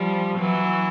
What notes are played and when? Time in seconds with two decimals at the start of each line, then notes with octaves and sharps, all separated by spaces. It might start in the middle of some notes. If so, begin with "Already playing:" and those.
Already playing: F3 G3
0.38 E3 F#3